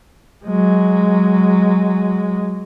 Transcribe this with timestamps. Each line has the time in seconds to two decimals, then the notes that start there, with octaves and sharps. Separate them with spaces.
0.45 F#3 G#3